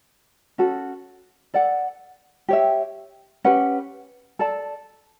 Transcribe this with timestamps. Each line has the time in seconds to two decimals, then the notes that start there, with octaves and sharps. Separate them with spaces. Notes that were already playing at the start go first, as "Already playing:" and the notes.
0.58 C#4 F#4 A4
1.54 A4 D5 F#5
2.49 G4 C#5 E5
3.44 C#4 G4 B4 F#5
4.39 A4 D5 A5